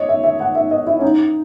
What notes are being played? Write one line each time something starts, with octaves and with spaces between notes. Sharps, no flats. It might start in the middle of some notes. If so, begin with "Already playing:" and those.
Already playing: C#5 D#5
E5
E5
F#5
E5
D#5
E4
C#4
D#4